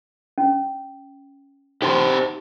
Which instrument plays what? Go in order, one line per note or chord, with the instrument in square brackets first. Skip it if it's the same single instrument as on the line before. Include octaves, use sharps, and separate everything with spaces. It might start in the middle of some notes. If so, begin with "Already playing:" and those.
[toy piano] C#4
[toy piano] D#4 C6 [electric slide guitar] G4 C5 A5